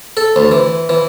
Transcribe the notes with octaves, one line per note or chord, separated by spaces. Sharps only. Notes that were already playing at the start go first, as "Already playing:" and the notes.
A4
D2
E3
E3